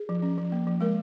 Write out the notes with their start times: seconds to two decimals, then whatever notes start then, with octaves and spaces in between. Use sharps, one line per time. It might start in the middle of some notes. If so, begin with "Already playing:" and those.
Already playing: G#4
0.09 F3
0.22 C#4
0.38 F3
0.52 A#3
0.67 F3
0.81 G#3 A#4